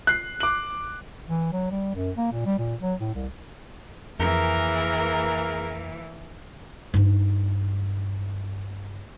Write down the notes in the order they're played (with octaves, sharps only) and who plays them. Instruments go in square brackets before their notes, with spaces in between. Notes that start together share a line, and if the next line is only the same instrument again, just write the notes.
[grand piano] F#6 C7
D6 F#7
[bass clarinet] E3
F#3
G3
F#2
A#3
A#2
G3
A#2
F#3
A2
C2
[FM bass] F2 [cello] E3 A#3 [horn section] G#4 A#4
[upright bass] G2 D#4